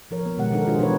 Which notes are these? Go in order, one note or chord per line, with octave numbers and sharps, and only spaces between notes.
F3 A#4 C#5
B3
B2 D#3 G#3 G4 F#5
D4 D#4 A4 A#4
D4 F4 F#4 G#4 C5
E3 B3 D#4 B4 C#5